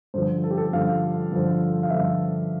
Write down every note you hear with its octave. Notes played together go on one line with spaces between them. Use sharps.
G2 D3 F3 C5
A4
G4
A4
G2 D3 F3 F5
G2 D3 F3
F5
G2 D3 F3 E5